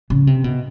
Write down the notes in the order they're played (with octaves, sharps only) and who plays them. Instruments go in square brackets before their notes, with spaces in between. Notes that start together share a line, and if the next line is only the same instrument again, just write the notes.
[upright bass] C#3
C3
B2